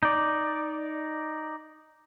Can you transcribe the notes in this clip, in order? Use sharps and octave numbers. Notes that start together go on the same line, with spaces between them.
D#4 D5